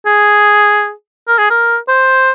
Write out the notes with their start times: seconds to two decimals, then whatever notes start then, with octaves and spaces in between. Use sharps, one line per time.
0.06 G#4
1.28 A#4
1.39 G#4
1.50 A#4
1.89 C5